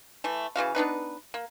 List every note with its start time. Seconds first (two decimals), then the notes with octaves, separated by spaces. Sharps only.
0.24 E3 A3
0.56 C#3 E3 F#4 F5
0.75 B3 D4 D#4 B4
1.34 A#3